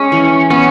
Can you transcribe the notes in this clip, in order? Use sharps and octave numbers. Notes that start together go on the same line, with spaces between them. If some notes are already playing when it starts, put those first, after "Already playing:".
Already playing: G#3 C#4
E3
B3 C#4